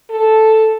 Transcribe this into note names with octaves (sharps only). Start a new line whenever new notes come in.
A4